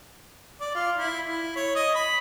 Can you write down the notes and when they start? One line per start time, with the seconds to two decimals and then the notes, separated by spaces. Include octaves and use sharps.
0.61 D5
0.75 F4
0.97 E4
1.26 E4
1.56 C#5
1.75 D#5
1.95 B5